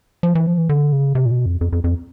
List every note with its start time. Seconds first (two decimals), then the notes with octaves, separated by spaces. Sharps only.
0.23 F3
0.35 E3
0.46 F3
0.58 E3
0.69 D3
0.92 C#3
1.15 C3
1.26 A#2
1.31 B2
1.46 F2
1.61 F2
1.72 F2
1.84 F2